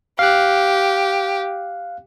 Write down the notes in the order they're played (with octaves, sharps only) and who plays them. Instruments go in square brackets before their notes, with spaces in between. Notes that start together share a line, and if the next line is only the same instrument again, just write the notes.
[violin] G4 [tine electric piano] F5 F#6